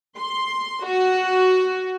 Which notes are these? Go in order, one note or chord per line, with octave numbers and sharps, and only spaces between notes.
C6
F#4